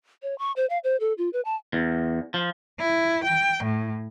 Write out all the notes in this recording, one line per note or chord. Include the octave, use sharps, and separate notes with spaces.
C#5
C#6
C5
F5
C5
A4
F4
B4
A5
E2
F3
E4
G5
A2